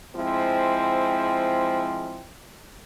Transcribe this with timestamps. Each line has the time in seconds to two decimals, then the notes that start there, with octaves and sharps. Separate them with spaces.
0.15 F3 G#3 C4 E4